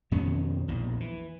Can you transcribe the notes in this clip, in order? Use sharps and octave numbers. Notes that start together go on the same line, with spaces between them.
F2 B2 D#3 C#4
A#1 E2
E3